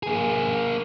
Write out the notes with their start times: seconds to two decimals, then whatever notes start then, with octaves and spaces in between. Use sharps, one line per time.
0.03 A#3 G#4